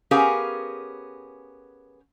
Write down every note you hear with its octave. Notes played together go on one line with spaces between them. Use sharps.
B3 C#4 G4 G#4 A#4 F5